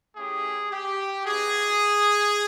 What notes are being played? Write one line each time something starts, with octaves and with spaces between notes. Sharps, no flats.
A3 C#4 E4 G4 G#4
G4
B3 D#4 F#4 G#4